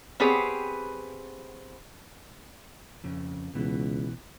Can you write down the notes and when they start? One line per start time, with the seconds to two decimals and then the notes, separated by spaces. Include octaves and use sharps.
0.20 B3 C4 G4 G#4 B4 C#5
3.04 F2 C#3
3.55 C#2 B2 E3